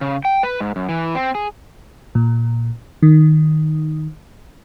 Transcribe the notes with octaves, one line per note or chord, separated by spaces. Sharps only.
C#3
G5
B4
G#2
F#2
E3
C4
G#4
A#2
D#3